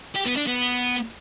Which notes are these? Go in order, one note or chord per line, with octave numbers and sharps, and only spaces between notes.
G4
B3
D4
B3